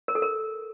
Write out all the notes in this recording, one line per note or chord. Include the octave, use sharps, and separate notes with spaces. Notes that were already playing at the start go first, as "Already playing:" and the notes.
A#4
A4
A#4